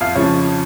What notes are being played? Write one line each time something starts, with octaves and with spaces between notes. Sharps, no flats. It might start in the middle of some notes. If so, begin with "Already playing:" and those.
F2 F5
C#3 F3 C#5